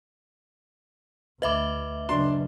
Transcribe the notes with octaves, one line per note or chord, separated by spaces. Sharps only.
D2 B4 D#5 E5 B5 D6
F#1 F#2 D4 C6